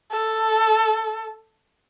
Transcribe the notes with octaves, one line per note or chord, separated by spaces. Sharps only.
A4